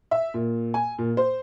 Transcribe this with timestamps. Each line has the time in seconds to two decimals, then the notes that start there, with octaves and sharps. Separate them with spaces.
0.11 E5
0.34 A#2
0.74 G#5
0.99 A#2
1.17 C5